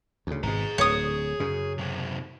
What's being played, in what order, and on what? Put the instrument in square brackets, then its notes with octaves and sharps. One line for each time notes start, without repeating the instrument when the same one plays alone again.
[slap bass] D2 C#3
[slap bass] G#1 B2 [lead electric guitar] G#4 A#5
[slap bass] D1 D3 [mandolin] C#5 D#6
[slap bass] F#2 C#3
[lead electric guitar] C3 F#3